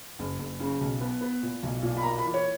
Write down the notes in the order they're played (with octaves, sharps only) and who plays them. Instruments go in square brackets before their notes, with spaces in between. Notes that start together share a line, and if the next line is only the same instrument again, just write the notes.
[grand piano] F#1
F#1
C#3
B1
B3
B3
A#2
B1
A#2
B5
A#3 A#5
B5
E3
C#5